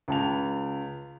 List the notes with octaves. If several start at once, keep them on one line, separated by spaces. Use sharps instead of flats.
C#2 A5 F7